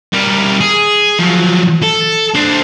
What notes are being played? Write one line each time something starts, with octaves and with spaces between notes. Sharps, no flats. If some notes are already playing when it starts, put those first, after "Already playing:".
G3 A#4
G#4
F3 F#3
A4
D4 C5